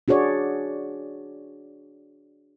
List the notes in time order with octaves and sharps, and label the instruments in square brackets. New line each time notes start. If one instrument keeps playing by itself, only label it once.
[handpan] D4 F#4 G#4 C#5 D5